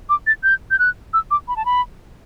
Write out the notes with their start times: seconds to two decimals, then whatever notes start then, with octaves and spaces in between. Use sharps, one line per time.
0.09 D6
0.27 A6
0.43 G6
0.71 G6
0.79 F#6
1.14 E6
1.31 D6
1.48 B5
1.56 A5
1.65 B5